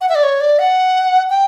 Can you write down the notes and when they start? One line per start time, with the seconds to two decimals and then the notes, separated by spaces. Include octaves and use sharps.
0.01 F#5
0.09 E5
0.15 D5
0.23 C#5
0.41 D5
0.59 F#5
1.30 G5